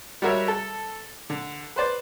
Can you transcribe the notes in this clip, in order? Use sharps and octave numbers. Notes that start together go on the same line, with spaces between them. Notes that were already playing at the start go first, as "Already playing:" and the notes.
G3 G#3 F#4 A#4 C#5 E5
A4
D3
B4 C5 D5